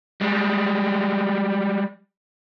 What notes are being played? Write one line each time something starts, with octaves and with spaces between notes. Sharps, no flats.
G3 G#3